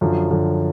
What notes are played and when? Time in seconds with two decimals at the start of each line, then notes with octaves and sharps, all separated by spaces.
0.01 F#2 D3 F3
0.31 F#2 D3 F3